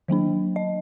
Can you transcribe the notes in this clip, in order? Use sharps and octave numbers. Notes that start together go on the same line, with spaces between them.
D#3 F#3 A#3 D4
D#5